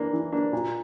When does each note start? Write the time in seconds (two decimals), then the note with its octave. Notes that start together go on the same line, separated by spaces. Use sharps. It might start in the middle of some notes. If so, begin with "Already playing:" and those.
Already playing: E3 A#3 D4
0.13 E3
0.32 A#3 D4
0.53 A#2